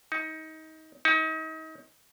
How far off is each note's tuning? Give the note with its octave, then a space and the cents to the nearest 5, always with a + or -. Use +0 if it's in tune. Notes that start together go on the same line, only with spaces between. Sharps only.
D#4 +25
D#4 +35